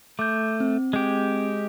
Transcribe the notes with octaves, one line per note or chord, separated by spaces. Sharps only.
A3 D6 G6
C4
G#3 G4